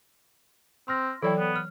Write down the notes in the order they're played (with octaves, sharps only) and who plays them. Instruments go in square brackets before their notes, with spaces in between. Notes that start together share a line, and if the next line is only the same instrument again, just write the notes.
[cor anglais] C4 [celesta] C6 F6 A#6
[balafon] E3 F#3 C#5 [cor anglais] E4 [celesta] A4 D5 G5
[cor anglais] B3
[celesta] F6